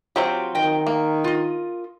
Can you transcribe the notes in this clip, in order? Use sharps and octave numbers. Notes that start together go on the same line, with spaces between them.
F#3 C4 F4 G4
D#3 D#5 G5
A#3
F4 D#5